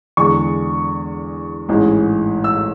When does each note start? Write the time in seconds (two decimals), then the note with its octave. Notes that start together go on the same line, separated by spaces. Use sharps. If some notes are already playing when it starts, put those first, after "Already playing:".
0.17 E2 D3 G#3 C#6
1.69 A1 G#2 E3 G#3
2.44 E6